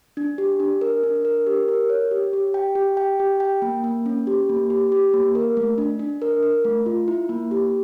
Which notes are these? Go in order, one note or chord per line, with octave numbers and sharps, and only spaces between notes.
D4
G4
D4
A#4
D4
A#4
G4
A#4
C#5
G4
G4
G5
G4
G5
G4
G5
A#3
A#3
C#4
G4
A#3
G4
G4
A#3
A#4
A3
D4
D4
A#4
A#4
A3
F4
E4
A#3
G4